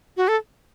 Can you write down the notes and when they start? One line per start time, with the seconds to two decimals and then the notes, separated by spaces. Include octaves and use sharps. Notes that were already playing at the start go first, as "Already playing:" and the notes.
0.17 F#4
0.28 A4